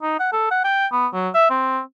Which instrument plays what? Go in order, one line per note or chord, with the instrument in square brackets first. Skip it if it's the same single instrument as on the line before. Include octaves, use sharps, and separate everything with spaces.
[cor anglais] D#4
F#5
A4
F#5
G5
B3
F#3
E5
C4